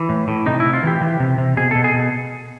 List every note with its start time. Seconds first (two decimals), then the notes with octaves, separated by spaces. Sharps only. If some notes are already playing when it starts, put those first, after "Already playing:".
Already playing: E3
0.09 A2
0.28 A2
0.46 C3 D#4
0.60 E4
0.65 C3
0.73 F4
0.83 E3 G4
1.01 E3
1.20 C3
1.38 C3
1.57 B2 G#4
1.71 B2 A4
1.84 G#4
1.93 B2